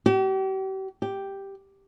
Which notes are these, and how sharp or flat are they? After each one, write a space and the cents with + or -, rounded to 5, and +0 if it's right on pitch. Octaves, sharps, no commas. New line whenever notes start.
G4 -40
G4 +0